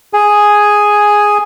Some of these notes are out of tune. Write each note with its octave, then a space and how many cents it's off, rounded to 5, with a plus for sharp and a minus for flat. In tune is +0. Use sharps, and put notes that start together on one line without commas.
G#4 +0 G#5 +0